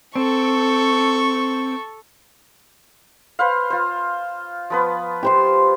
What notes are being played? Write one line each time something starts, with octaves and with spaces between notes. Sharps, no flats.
C4 A4 C#6
B4 C5 F5
F4 C5
F3 B3 B4
G4 C5 C6